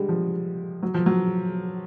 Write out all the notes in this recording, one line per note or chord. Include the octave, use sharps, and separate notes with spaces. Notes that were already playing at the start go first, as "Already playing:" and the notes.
Already playing: D3 G3 G#3
F3
F#3
F3
F#3